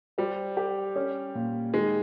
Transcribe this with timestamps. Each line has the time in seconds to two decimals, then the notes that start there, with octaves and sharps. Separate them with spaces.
0.18 G3 C5
0.57 G4
0.96 C#4
1.35 A#2
1.74 D#3 G#3